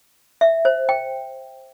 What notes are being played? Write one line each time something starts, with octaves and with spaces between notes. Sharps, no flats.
E5
C5
G5